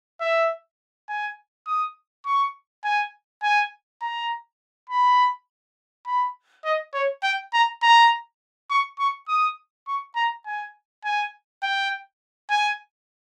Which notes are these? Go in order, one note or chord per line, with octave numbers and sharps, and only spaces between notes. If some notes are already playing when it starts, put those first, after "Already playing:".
E5
G#5
D#6
C#6
G#5
G#5
A#5
B5
B5
D#5
C#5
G5
A#5
A#5
C#6
C#6
D#6
C#6
A#5
G#5
G#5
G5
G#5